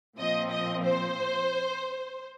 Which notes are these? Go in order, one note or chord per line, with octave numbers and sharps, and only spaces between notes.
A#2 F3 C4 D#5
D#5
C5